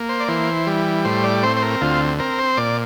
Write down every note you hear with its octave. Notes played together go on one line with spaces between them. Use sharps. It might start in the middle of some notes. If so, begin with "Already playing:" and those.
Already playing: A#3
C5
D5
E3 C5
G3
A2 C5
D5
C4 C5
C5
A#4
D2 F4
C4 A#4
C5
A#2 D5